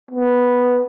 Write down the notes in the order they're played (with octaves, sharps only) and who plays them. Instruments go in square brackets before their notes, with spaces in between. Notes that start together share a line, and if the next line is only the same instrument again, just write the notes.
[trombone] B3